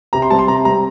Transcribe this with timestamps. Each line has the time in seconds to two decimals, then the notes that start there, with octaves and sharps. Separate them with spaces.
0.13 C3 A#5
0.22 C6
0.30 G3 A5
0.33 C4
0.39 C6
0.48 C3 A#5
0.64 G3 A#5
0.69 C4